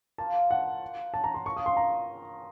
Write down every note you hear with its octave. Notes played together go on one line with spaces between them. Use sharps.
A#3 F4 C5 F5 A5
F#5
A5
A#5
C6
A#3 F4 A#4 F5 C#6
D#6
C6
A#5